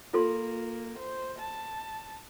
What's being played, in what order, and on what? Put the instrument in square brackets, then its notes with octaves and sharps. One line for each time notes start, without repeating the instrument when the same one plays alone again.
[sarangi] A#3 [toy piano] F4 A4 C6
[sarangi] C5
A5